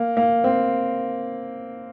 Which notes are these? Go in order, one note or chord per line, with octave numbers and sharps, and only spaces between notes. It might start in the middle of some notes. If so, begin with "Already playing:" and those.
Already playing: A#3
A#3
C4